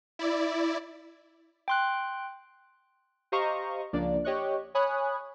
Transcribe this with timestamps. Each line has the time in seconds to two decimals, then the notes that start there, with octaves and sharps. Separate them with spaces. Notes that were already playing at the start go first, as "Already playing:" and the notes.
0.19 E4 D5
1.68 G5 C6 F#6
3.32 G4 C5 D#5 F5 A#5 C#6
3.93 C#2 F3 A#3 D4 D5
4.25 G4 C#5 D#5 C#6 F#6
4.75 C#5 G#5 B5 D#6 F#6